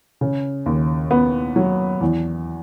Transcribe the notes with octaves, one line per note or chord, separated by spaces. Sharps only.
C#3
D#2
B3
F#3
E2